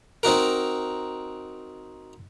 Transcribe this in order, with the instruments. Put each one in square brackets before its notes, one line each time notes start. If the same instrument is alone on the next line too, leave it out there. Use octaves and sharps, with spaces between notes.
[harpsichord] C4 D#4 F#4 A#4